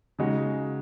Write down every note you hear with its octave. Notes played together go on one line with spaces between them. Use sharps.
C#3 G#3 D#4 F#4